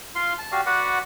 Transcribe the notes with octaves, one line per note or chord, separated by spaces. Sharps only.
F4 F5 C6
A5
F#4 G4 D5 F5
F#4 B4 D5 F#5